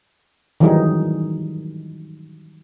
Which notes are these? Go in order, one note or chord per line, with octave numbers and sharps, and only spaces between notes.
D#3 E3 F#3 G3 D#4 G#4